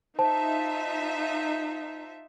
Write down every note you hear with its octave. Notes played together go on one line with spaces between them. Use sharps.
D#4 F4 C5 E5 A5